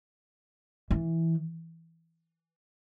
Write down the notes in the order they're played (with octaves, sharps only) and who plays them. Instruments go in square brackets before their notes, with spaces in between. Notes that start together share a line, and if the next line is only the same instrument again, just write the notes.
[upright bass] E3